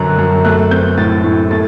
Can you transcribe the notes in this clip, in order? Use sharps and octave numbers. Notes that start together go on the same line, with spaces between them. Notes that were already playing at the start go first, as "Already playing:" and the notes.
Already playing: F#2 D3 F#3 A#5 F#6
F#2
A3 F#6
C4 G6
A2 A6
A2
A3 A6